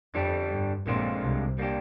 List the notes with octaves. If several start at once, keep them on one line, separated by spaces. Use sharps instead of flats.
F2 D3 G3 D4 G4
G2
A#1 A#2 D3 G#3 C4 F4
C2 C3
G3 A#3 D4 G4